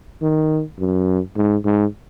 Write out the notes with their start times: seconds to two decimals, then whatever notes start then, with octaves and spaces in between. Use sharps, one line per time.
0.22 D#3
0.79 F#2
1.36 G#2
1.65 G#2